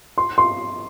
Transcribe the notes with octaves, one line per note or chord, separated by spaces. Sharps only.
C6
C6